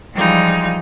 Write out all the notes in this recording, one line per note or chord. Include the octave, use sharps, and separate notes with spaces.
E3 F3 G3 G#3 D#4 F4